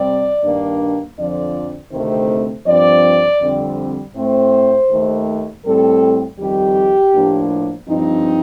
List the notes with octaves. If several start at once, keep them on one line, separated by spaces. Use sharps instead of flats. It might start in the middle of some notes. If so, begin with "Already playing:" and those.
Already playing: C3 G3 C4 D5
G2 D#3 A#3 D4
F2 D3 F3 D5
D2 C3 D#3 A3 C4 C5
G2 F3 C4 D5
F2 D3 G3 C4
A2 A3 C4 C5
D#2 D#3 A3
A2 G3 C4 A4
F2 D#3 G3 G4
A2 F3 A#3 D4
G2 F3 C4 D#4